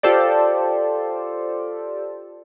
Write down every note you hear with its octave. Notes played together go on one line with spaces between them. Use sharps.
F4 G4 A4 C5 D5